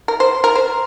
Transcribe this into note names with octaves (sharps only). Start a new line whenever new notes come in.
A#4
C5
A#4
C5